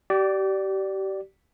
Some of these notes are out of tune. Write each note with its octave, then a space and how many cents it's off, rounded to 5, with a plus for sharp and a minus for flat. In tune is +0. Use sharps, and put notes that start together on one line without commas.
G4 -30 D5 +0